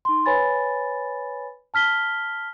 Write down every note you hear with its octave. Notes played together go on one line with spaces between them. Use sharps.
D#4 C6
B4 C#5 G#5 B5 A6
A5 F6 B6 G7